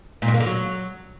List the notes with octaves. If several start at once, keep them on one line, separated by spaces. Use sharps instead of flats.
A#2
G2
A#3
D3
F#3